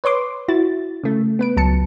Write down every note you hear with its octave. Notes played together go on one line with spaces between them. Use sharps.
B4 C#5 C6 D6
E4 F#4 A6
C#3 A3
B3 B4 D7
C#2 F#3 A5 C#7